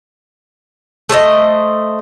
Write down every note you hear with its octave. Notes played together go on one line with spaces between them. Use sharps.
A3 C5 C#5 D#5